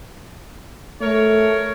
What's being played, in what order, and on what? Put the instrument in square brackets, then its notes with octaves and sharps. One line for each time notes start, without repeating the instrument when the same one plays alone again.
[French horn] A3 [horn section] A#4 C#5